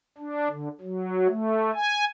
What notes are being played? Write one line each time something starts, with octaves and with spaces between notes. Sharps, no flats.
D4
D3
F#3
A3
G#5